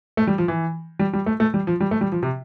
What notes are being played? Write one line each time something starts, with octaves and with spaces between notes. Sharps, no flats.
A3
G3
F3
E3
G3
G3
A3
A3
G3
F3
G3
A3
G3
F3
C3